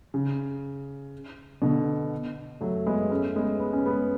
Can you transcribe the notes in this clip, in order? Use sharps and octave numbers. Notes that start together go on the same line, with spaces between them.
C#3
B2 D3
F#3 A3
G#3 B3
A3 C#4
G#3 B3
B3
C#4
G#3 B3